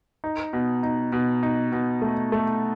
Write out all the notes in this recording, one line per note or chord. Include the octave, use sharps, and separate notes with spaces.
D#4
B2
D#4
B2
D#4
B2
A3
A3